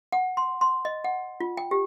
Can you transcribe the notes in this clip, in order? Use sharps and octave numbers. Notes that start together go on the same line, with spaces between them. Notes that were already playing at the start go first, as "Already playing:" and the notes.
F#5
C6
C6
D#5
F#5
F4
G5
G4